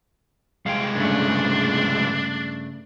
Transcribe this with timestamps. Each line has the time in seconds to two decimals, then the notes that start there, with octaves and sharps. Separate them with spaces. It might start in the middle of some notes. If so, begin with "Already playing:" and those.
0.66 C2 G#3 F5 G5
0.95 G2 C#3 A3 D4